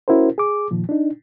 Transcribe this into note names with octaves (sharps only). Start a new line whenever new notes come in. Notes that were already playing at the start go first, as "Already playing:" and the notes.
C#4 E4 F#4 A#4 C5
G#4 D6
A#2 D#3 F3
D4 D#4